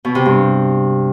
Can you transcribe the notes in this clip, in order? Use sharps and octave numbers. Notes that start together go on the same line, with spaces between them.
B2
C3
G2